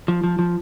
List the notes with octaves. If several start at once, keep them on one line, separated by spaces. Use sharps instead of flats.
F3
F3
F3